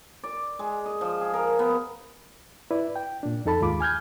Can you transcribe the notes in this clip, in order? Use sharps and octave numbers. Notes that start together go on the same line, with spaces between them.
D5
G#3
D#5
F3
G#4
A#4
B3
E4 B4 D5
G5
A#2 D4
F2 D#4 A4 A5 B5
D#2 G#2 G#3 F4 B5 D6
G#5 F6 G6 G#6